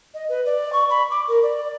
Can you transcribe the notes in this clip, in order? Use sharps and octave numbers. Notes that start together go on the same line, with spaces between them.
D#5
B4
D5
C#6
B5
D6
A#4
D5